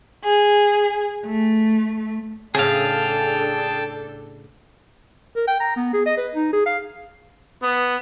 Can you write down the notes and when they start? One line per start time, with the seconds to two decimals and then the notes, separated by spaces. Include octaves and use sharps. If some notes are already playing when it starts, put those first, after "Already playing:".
0.23 G#4
1.26 A3
2.55 A2 C#3 D4 G#4 A4 F5 G5 A5
5.36 A#4
5.47 G5
5.60 A#5
5.76 B3
5.93 G#4
6.06 D#5
6.17 B4
6.35 D#4
6.53 G#4
6.66 F5
7.63 B3